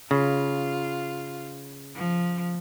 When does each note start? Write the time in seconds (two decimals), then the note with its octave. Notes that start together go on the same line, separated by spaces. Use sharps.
0.11 C#3 F4
1.94 F3